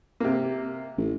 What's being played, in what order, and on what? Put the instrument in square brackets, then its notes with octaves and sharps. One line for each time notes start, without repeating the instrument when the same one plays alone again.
[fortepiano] C3 A#3
[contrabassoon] A1